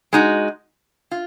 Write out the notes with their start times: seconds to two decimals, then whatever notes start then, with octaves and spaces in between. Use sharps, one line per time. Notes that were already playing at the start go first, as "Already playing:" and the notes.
0.13 G#3 D#4 F#4
1.11 F4